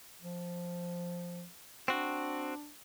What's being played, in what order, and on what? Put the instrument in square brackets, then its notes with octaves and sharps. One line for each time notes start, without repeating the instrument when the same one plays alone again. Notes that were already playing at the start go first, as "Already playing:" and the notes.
[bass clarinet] F3
[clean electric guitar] C4 F#4 [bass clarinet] D4